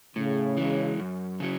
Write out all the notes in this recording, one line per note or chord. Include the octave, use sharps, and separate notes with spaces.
A2 C#3
E3 G#3
F#2
C#3 F#3